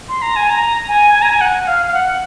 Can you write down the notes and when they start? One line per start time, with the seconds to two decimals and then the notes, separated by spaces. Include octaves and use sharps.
0.09 C6
0.22 A#5
0.36 G#5
0.50 A#5
0.88 G#5
1.14 G#5
1.22 A#5
1.29 G#5
1.41 F#5
1.67 F5
1.87 F5
1.94 F#5